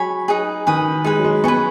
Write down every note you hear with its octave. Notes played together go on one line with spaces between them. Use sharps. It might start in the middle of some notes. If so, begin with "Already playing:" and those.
Already playing: F#3 G#3 C#5 G#5 B5
D#4 G#4 B4
D#3 B4 G#5 D#6
G#3 D#4 G#4 B4
F#3
G#3
B3 B4 G#5 C#6